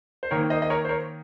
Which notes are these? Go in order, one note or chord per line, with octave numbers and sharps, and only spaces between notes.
C5
D#3 A#3 A#4 C#5
C5 D#5
D#5
A#4 C#5
C5
A#4 C#5